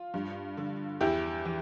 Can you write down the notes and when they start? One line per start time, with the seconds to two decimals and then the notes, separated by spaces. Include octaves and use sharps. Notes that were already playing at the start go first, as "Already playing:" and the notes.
Already playing: F4
0.14 G2
0.57 D3
1.01 E2 E4 G4
1.45 E3